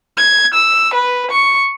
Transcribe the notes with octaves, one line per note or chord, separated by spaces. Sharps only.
G#6
E6
B4
C#6